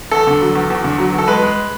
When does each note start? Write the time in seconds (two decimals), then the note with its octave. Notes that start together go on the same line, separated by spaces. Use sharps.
0.11 E2 A4
0.27 D3
0.41 F#3
0.55 E2
0.70 E2
0.84 D3
0.98 F#3
1.13 E2
1.18 A4
1.27 G#3 B4
1.42 G#3